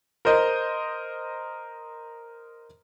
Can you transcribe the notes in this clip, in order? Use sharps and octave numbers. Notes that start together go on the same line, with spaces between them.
A#4 C5 D#5